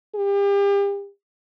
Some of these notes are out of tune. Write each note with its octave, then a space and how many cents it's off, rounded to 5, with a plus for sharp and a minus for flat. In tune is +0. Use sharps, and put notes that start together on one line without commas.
G4 +35